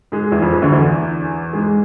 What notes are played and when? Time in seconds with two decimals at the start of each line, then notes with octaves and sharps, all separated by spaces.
0.12 G#2 G#3
0.32 E2 E3
0.42 F2 F3
0.53 G#2 G#3
0.62 D2 D3
0.72 E2 E3
1.53 G#2 G#3